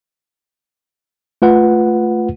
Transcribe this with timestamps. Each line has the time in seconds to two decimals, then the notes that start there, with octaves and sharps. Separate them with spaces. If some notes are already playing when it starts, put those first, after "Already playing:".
1.42 A3 F4 B4 F#5